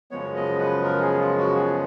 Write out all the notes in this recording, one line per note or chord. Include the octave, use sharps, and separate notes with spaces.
F#2 C#3 F3 G#3 B3 C#5
D#5
B4
A#4
G#4
F4
F#4
G#4